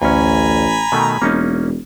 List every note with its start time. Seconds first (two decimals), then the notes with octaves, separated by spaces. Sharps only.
0.02 A1 D2 C#4 G#5 A#5 B5
0.92 B2 D#3 A3
1.22 E1 A#3 C#4 D#4